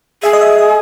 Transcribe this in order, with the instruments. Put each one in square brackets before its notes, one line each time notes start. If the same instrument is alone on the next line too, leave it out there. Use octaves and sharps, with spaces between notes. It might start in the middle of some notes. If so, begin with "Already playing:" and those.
[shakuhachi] G#4 [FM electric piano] E5
[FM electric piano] D#5
E5
D#5